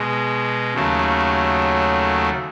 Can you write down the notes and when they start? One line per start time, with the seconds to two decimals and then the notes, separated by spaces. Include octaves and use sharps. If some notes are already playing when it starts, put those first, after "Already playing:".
Already playing: B2 G#3
0.74 D#2 C#3 F#3 A3